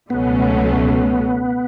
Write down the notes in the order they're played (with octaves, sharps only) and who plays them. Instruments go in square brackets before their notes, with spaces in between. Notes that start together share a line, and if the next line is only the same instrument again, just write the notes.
[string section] C#2 B2 F#3 A3 C#4 [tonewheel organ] B3